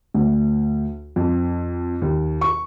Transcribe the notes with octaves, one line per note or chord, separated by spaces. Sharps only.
D2
F2
D#2
C#6